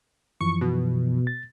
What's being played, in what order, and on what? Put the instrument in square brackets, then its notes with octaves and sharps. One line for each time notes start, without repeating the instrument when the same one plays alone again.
[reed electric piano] F#2 E3 F3 [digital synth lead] C#6
[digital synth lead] B2
[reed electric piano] A6